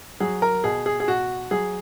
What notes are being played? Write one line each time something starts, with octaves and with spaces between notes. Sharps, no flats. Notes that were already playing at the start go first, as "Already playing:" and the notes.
F#3 G#4
A#4
B2 G#4
G#4
G#4
B2 F#4
F#3 G#4